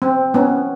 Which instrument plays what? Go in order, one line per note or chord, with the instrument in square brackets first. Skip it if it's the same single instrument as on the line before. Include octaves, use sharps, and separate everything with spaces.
[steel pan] C4
B3 C#4